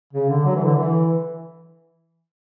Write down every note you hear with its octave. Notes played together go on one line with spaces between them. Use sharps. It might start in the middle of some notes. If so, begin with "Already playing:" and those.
C#3
D3
F#3
E3
D3
E3